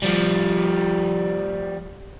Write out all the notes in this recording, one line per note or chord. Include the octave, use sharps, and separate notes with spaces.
F3 G3